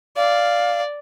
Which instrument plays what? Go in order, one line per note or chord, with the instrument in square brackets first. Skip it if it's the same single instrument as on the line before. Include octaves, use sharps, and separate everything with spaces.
[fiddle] D5 [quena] F5